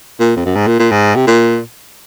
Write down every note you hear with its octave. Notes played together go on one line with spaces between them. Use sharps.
A#2
F2
F#2
G#2
A#2
A#2
G#2
C3
A#2